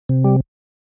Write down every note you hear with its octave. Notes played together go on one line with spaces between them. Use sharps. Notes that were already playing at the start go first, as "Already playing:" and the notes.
C3
G3